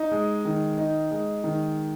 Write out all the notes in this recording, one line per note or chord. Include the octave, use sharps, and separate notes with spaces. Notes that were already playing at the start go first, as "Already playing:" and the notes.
Already playing: D#4
G#3
D#3
D#4
G#3
D#3